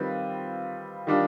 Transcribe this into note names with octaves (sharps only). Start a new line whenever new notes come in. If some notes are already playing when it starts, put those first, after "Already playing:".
Already playing: D#3 G3 C4 F4 B4
D#3 G3 D4 F4